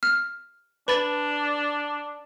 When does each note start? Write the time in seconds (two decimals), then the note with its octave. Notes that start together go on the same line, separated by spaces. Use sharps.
0.03 F6
0.88 D4 B4 B5 A6